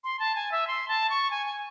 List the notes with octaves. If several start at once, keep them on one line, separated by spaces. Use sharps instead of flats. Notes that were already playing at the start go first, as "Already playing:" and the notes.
C6
A5
G#5
E5
C6
A5
C#6
G#5
G#5